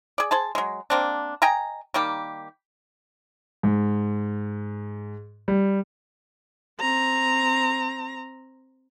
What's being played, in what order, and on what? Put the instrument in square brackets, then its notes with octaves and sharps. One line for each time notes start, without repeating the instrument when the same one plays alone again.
[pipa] G#4 D5
G#4 C5 A5
F#3 G#3
A#3 C4 D4
D#5 G5 G#5 A#5
D#3 G3 A#3 G4
[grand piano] G#2
G3
[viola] C4 A#5